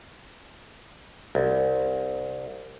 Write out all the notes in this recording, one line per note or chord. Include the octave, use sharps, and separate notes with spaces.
C2